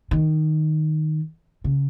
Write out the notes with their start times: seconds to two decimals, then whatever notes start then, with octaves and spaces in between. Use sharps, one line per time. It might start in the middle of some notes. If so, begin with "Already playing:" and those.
0.11 D#3
1.64 C#3